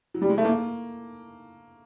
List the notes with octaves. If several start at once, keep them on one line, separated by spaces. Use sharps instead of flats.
F#3
G3
G#3
A3
A#3